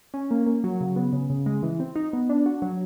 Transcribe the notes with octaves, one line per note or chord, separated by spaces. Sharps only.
C#4
A#3
A#3
F#3
C#3
B3
C#3
C#3
G#3
E3
C4
D#4
B3
D4
F#4
F#3